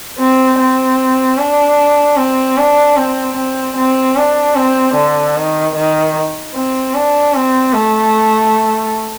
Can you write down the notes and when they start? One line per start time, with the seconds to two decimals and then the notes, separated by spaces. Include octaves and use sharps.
0.18 C4
0.59 C4
1.38 D4
2.17 C4
2.58 D4
2.96 C4
3.37 C4
3.77 C4
4.16 D4
4.55 C4
4.95 D3
5.36 D#3
5.75 D#3
6.54 C4
6.94 D4
7.34 C4
7.73 A3